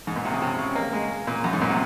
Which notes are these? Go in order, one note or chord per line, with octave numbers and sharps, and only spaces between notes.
G#2
A#2
C3
C#3
C3
C#3
A#3
G#3
A#2
F#2
G#2
A#2
C3